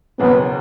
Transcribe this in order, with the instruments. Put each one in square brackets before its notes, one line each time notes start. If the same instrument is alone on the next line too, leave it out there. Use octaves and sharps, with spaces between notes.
[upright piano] F#1 E2 B2 F#3 [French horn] B3